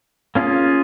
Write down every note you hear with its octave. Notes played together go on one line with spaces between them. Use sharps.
A#3 C#4 F4 G#4